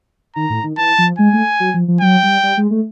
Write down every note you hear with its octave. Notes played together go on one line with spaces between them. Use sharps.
D#3 A#5
A2
D#3
E3 A5
F3
G#3 G#5
A3
F#3
F3
F3
F#3 G5
G3
G3
G#3
A3